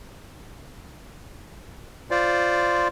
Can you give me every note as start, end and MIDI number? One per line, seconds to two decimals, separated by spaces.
2.11 2.88 65
2.11 2.88 72
2.11 2.88 74